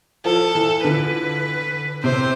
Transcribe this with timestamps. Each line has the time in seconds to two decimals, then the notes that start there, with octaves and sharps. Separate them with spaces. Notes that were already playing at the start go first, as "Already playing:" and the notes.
0.25 F3 A4
0.55 E3
0.84 D3 B4
2.04 C3 C5